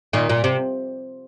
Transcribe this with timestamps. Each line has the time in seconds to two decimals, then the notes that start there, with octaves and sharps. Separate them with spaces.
0.13 A#2 D#3
0.29 A#2
0.44 C3